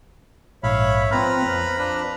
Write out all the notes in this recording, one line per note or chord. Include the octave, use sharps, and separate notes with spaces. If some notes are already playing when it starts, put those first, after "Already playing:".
A#1 G#2 C#5 E5 F5 B5
F3 C4 B4 A#5 B5 F6
F2
D4 B4